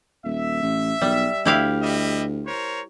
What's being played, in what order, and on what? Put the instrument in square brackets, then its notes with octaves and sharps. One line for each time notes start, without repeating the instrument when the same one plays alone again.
[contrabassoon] D#1 [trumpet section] E5
[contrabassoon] A1
[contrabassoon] B1 [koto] G3
[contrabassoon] D2 [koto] E4 G4 F5
[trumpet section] G3 D#5 E5
A#4 C5 C#5